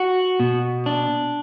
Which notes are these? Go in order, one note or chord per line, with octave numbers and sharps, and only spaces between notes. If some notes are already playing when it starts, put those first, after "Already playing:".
Already playing: F#4
B2
D4